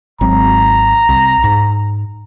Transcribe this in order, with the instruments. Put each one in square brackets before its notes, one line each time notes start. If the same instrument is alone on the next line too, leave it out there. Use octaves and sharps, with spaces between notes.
[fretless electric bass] G#1 F#3 C4 [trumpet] A#5
[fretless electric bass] C2
G#2